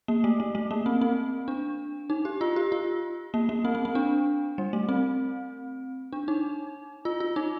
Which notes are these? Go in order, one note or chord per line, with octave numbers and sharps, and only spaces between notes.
A#3
A3
A3
A3
A#3
C4
C4
D4
D#4
G4
F4
G4
F4
A#3
A#3
C4
C4
C4
D4
G3
A3
C4
D4
D#4
F4
F4
D#4